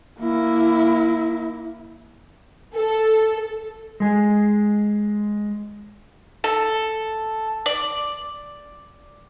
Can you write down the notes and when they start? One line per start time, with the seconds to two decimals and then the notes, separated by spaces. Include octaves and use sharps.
0.20 A#3 E4
2.75 A4
4.00 G#3 G#4
6.44 A4
7.66 D5